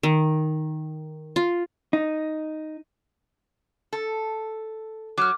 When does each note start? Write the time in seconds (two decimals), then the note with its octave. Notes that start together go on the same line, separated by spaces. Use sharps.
0.03 D#3
1.36 F4
1.93 D#4
3.93 A4
5.18 F#3 D6 F6